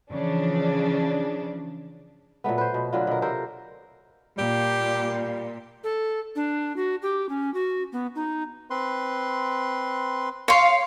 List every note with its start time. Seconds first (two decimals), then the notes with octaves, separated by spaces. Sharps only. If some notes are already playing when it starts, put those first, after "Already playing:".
0.11 C#3 E3 F3 D4
2.44 A#2 F#3 A3 B3
2.58 B4 C5
2.74 B2
2.93 D3 F#3 F4
3.07 B2 A#4
3.22 C3 A4 A#4 C5
4.38 A#2 G3 G4
5.84 A4
6.36 D4
6.76 F#4
7.02 G4
7.29 C#4
7.54 F#4
7.93 B3
8.15 D#4
8.70 C4 B4 C6
10.48 C#5 F5 C6